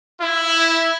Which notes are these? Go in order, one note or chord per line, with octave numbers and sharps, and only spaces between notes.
E4